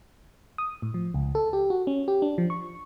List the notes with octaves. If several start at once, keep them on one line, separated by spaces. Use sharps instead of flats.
D#6
A2
F3
C#2
A4
G4
F#4
C#4
G4
D4
F3
C#6